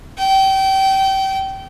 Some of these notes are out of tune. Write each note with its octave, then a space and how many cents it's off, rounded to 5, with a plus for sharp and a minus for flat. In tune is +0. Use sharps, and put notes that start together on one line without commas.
G5 -25